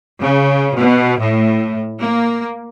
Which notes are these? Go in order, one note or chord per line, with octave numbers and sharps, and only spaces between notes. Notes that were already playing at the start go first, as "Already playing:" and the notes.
C#3
B2
A2
A#3